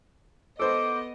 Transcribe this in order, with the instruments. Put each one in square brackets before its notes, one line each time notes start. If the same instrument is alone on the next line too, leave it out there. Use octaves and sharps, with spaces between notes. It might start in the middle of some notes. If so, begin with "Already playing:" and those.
[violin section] B3 D#5 [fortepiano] A4 C5 [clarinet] D6